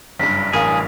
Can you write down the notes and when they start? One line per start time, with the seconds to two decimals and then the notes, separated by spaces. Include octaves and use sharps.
0.19 F#1 G2 B6
0.53 A1 G#4 A#4 F5